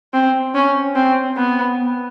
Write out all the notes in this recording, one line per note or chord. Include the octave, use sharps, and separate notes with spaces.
C4
C#4
C4
B3